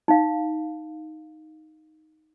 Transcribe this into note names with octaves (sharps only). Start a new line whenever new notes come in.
D#4 F5